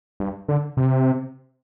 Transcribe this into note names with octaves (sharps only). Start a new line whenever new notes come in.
G2
D3
C3